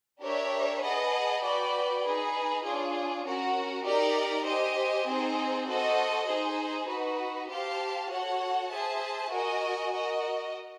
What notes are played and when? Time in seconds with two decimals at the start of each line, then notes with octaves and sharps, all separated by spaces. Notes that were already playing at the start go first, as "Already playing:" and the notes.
0.22 D4 G4 A#4 C#5 E5
0.82 G#4 B4 D#5 F#5 A5
1.43 F#4 B4 D5 G5
2.03 D#4 G#4 B4
2.64 D4 F4 G#4 C#5
3.25 C#4 F#4 A#4
3.85 D#4 G4 A#4 D5
4.46 G4 C5 D#5 G#5
5.07 C4 D#4 G#4 C5
5.68 F#4 A4 C5 D#5
6.28 D#4 G#4 C5
6.89 D#4 F#4 B4
7.49 G4 C5 F5 A5
8.10 F#4 A4 C#5 F#5
8.71 G#4 C5 E5 A5
9.31 F#4 A#4 D#5 G#5
9.92 F#4 A#4 D#5